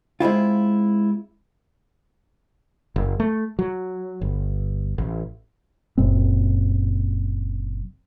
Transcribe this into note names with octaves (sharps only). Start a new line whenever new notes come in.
G#3 C4 E4 F4
F#1
A3
F#3
G1
A1
F#1 F#2 A#2 C4